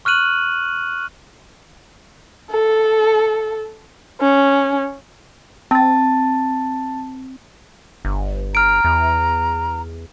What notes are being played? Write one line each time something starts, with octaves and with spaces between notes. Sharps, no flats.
C#6 F6 F#6 D#7 F#7
A4
C#4
C4 A5 A6
G1
A#5 F6 D7
E2